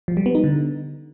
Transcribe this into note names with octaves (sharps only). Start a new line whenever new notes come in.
F3
G3
B3
D#4
D3